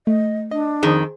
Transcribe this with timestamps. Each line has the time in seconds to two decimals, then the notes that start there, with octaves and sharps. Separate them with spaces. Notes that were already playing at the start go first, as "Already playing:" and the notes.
0.07 A3 D#5
0.51 D4 D#5
0.83 F2 D#3 G#4 C5